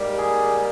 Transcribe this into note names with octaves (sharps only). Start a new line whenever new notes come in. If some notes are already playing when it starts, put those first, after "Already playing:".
Already playing: G#2 G3 A#3
G#4